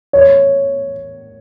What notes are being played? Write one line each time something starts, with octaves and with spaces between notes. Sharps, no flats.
C#5